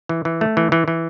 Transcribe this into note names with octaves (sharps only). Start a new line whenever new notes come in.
E3
E3
A3
E3
E3
E3